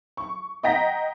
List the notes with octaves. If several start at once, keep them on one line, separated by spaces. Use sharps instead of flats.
C#6
D#5 F#5 G5 A#5 A#6 B6